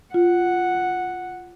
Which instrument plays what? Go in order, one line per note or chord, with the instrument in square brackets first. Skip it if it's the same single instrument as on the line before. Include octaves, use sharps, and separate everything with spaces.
[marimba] F4 [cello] F#5